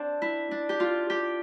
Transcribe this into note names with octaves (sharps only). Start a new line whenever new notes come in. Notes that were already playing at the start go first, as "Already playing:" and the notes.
Already playing: C4 D4
E4
D4
G4
F4
G4